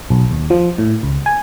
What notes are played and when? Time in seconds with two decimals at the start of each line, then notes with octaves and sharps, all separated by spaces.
0.10 B1
0.31 D#2
0.50 F3
0.78 A2
1.03 C#2
1.26 G#5